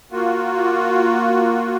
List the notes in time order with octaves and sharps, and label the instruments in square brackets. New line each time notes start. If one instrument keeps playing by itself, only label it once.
[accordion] A#3 F4 F#4